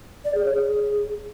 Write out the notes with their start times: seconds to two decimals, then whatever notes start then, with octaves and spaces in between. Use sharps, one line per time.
0.25 D5
0.35 G#4
0.45 C#5
0.55 G#4